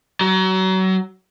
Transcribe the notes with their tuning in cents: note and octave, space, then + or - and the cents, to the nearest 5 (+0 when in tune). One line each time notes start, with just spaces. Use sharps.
F#3 +30